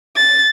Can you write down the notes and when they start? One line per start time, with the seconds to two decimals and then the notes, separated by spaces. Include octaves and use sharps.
0.16 A6